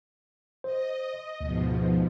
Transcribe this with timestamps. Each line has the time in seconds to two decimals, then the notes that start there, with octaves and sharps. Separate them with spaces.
0.64 C5 D#5
1.41 D2 G#2 B2 F3